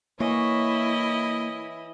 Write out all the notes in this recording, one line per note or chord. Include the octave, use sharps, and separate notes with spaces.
E3 A#3 E4 C#5 D#5